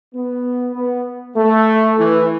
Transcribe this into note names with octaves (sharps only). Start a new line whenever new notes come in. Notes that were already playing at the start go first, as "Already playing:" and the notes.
B3
B3
A3
E3